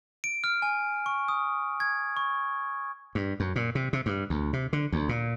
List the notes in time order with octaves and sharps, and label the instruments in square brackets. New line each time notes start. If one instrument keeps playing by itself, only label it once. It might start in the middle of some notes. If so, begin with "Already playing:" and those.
[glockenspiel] D7
F6
G#5
C#6
D#6
G#6
C#6
[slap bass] G2
F#2
A#2
C3
C3
G2
D2
C3
D3
D2
A#2